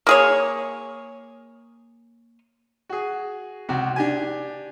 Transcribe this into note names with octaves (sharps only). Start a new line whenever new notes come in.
A#3 G#4 C#5
F#4 G#4
C#2 C3 F#4
D4 G4 G#5